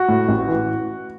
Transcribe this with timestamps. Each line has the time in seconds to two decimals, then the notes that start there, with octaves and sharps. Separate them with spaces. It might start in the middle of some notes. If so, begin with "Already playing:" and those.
Already playing: F#4
0.08 A2
0.28 A1
0.48 E3